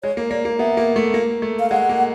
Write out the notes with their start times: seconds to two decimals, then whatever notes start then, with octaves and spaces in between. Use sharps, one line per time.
0.03 G#3 C#5
0.17 A#3
0.30 A#3 D5
0.45 A#3
0.59 B3 E5
0.77 A#3
0.96 A3
1.14 A#3
1.42 A3
1.60 F5
1.70 G#3 F#5
1.89 A#3